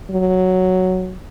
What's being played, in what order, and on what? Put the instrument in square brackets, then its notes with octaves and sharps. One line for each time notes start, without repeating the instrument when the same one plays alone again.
[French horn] F#3